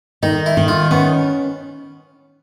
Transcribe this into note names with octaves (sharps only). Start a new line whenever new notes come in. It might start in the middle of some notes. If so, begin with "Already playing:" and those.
D#3 D#4
E4
D#3
F4
B3 C#4